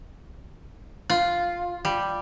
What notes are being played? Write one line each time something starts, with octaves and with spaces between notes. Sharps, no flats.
F4
G3